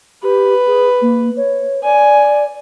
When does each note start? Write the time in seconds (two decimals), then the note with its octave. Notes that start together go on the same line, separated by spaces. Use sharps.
0.23 G4 B4
0.67 G#4
1.02 A#3
1.37 C#5
1.84 D5 G#5